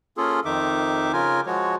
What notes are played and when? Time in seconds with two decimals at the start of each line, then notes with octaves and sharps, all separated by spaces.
0.17 A#3 C#4 F4 G#4 A4
0.45 F2 D#3 D#4 E5 D6
1.13 C#3 F4 A#4 G#5
1.46 F3 G#3 F#4 C#5